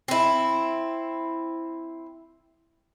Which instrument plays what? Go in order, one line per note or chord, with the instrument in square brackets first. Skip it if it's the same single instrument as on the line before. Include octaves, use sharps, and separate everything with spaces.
[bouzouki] C4 E4